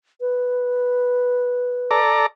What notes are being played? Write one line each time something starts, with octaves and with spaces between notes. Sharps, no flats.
B4
A4 D5 A#5